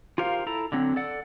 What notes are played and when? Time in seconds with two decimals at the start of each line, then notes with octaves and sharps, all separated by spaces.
0.18 F4 G4 A#4 C5 F5
0.47 E4 A4 A#5
0.72 D3 F#3 C4
0.96 A4 D5 F#5